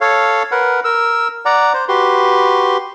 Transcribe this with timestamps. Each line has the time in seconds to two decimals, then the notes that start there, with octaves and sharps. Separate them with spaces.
0.01 A4 C#5 F5
0.51 A#4 B4 F#5
0.84 A#4 E6
1.45 D5 F#5 A#5
1.73 C5
1.88 F#4 G4 B4 C6